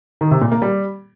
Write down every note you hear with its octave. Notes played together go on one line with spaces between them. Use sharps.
D#3
C3
A#2
A#3
G3